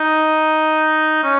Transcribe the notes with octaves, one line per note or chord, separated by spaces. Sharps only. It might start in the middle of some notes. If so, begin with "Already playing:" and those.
Already playing: D#4
C#4